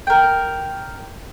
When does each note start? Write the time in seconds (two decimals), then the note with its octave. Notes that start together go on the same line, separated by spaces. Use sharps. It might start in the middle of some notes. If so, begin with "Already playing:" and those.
0.07 A#4 G5